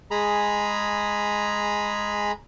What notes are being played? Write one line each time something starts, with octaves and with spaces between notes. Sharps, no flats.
G#3 G#4 A#5 B5